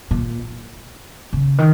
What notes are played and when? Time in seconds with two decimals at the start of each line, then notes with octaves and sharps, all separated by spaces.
0.11 A#2
1.33 C#3
1.58 D#3